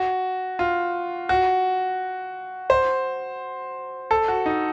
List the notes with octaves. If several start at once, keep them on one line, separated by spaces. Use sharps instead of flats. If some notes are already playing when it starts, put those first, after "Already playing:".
Already playing: F#4
F4
F#4
C5
A4
F#4
D#4